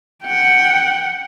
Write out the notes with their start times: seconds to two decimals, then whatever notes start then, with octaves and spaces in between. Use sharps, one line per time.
0.23 F#5 G5